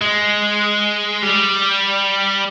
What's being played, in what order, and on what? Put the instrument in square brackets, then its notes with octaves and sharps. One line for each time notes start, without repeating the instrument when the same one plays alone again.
[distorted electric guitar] G#3
G3